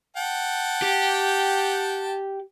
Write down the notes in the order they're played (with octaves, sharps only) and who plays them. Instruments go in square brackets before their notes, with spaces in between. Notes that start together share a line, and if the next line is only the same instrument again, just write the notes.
[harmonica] F#5 G5 A5
[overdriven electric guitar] G4